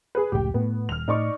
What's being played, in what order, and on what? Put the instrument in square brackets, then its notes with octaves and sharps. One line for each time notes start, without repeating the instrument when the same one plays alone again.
[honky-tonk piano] G#4 B4
[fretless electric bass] F1 C#2 A2 [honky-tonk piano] G4 G5
[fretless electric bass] A2 [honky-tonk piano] B3
[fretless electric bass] D#1 [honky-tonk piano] F6 F7
[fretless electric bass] A2 [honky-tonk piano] D#4 D5 C#6